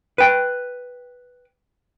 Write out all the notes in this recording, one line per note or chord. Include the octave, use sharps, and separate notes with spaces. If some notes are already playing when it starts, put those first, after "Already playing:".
B4 G5